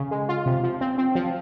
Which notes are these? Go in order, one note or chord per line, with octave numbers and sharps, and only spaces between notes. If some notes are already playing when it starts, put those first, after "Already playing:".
Already playing: C#3
G#3
F4
C3
F3
C4
C4
F3